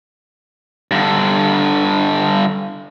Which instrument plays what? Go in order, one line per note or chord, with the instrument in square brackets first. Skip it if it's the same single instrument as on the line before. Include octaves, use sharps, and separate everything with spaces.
[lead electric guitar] G2 D3